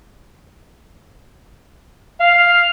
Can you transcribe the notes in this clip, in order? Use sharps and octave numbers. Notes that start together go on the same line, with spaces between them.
F5